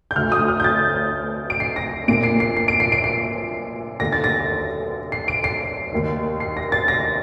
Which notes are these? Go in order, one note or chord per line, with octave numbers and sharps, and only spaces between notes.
G6
D2 D3 F6
D#6
F6
G6
A6
D7
C7
A#6
A#1 A#2 D7
C7
C7
C7
D7
C7
D7
C7
D#2 D3 A#6
A6
A#6
C7
D7
C7
D#2 D#3
C7
A#6
A6
A#6